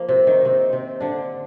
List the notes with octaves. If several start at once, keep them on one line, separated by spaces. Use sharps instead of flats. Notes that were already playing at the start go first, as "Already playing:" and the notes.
Already playing: F3 A#3
C3 C4
D#3 D#4
C3 C4
C3 C4
D3 D4